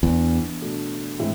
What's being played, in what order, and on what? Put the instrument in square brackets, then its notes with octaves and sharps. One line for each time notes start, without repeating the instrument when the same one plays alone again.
[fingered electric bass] E2 [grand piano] E3 B3 D4
[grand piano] B2 A3 D4
A2 E3 G#3 C4 E4